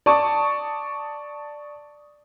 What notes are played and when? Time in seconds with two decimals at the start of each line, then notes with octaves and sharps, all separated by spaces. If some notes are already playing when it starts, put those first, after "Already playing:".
0.06 D5 A5 C#6 D#6